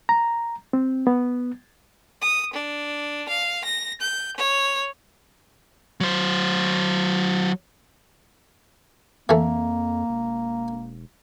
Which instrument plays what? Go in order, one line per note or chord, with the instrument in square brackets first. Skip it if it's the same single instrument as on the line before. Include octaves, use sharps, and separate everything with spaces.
[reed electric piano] A#5
C4
B3
[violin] D#6
D4
F5
A#6
G6
C#5
[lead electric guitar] F#3 C5
[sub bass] F2 [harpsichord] E3 A3 [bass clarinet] A#3
[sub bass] E1